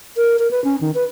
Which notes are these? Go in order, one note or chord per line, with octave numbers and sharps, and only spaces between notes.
A#4
A#4
B4
C#4
D#3
B4